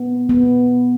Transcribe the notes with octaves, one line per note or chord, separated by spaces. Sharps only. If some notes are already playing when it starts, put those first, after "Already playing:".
Already playing: B3
B3